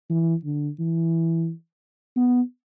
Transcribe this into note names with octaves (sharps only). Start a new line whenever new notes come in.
E3
D3
E3
B3